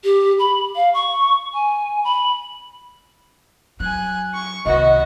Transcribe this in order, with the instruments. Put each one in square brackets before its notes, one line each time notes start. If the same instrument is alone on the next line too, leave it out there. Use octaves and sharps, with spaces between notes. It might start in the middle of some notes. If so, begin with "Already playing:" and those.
[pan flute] G4
B5
F5
C#6
G#5
B5
[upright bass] F#3 [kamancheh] G#5 F#6
[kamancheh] C#6
[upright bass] C2 D#3 [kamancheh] B3 F#4 [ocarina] D#5